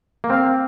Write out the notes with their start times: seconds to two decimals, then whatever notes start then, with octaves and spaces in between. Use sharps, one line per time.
0.24 A#3
0.30 C4 F5